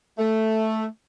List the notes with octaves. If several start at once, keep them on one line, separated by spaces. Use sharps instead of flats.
A3